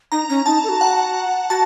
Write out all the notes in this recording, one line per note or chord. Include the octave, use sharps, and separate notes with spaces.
D#4 A#5
C#4
D#4 A5
A4
F#4
F#5
F#4 A5